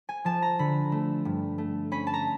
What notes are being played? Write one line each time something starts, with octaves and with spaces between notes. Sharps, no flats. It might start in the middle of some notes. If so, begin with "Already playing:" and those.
G#5
F3 A5
A#5
D3 B5
A3
G2
A3
C#4 B5
A5
A#5